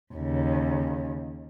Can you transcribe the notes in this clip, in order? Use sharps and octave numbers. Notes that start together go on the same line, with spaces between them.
D#2 C#3